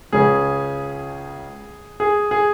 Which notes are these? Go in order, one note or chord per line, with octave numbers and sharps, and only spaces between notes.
C#2 C#3 G#4
G#4
G#4